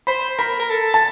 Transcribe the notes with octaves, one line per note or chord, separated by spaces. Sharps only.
C5 B5
A#4 B5
A#4
A4
A5